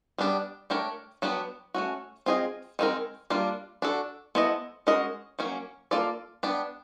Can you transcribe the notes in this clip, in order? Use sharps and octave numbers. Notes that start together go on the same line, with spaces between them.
G3 B3 D4 G4
A3 D4 G4 A#4 C#5
F#3 B3 D4 G4 B4
A3 C#4 F#4
C4 F4 G#4 B4 D#5
D#3 G#3 C4 F4 A#4
G3 A#3 D4 F4
D4 F#4 A4
B3 E4 A4 C5 D#5
G#3 C#4 F#4 A#4 D#5
F#3 A#3 C#4
A#3 D4 F4 A4 D5
B3 D4 G4